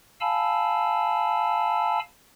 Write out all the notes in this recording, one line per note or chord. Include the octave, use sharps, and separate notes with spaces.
F5 G#5 A5 B5 E6